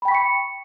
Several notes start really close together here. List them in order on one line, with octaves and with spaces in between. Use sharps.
B5 G5 B6 C#6 C#7